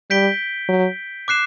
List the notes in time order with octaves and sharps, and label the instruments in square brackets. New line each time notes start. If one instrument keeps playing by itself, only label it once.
[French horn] G3 [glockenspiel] G6 B6 D7 G7
[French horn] F#3
[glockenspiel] D6 F#6 C7 E7